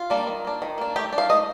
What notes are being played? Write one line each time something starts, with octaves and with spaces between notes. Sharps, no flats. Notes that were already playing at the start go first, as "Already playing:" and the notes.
Already playing: F4
G3 A#3 D4
D#3
A#3 D4
D#3
A#3 D4
A3 G4
D4
F5
A3 D#5